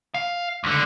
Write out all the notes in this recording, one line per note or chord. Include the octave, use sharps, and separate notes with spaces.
F5
C#2 D3